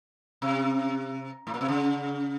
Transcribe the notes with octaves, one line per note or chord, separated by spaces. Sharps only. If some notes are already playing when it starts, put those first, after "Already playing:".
C3
A2
A#2
C3
C#3